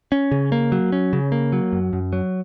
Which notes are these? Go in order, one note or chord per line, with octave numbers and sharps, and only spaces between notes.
C#4
C#3
A#3
F#3
C#4
C#3
A#3
F#3
F#2
F#2
F#3